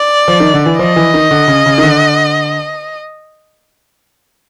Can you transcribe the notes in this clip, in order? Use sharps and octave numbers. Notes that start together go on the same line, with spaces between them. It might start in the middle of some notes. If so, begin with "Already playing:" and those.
Already playing: D5
F3
D#3
D3
E3
F3 D#5
E3
D#3
D3
C#3
C#3
D#3
D3